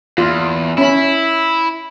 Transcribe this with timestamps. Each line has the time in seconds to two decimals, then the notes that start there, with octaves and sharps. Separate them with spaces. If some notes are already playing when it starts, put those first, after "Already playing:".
0.18 E2 F4
0.78 C#4 E4 B5